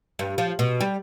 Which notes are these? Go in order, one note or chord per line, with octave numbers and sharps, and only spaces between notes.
G2
F3
B2
G3